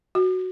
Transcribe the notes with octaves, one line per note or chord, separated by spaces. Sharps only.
F#4